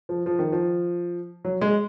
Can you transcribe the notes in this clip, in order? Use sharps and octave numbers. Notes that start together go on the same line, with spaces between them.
F3
F3
D#3
F3
F#3
G#3